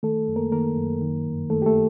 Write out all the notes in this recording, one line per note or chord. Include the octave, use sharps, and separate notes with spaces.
D#3 A3 A4
F#2
A#3 A#4
D#3 A#3 A#4
F#2
D#3
G2
D#3 A3 A4
G4
A3 A4